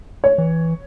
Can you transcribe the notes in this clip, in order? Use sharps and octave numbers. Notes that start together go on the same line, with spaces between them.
C#5
E3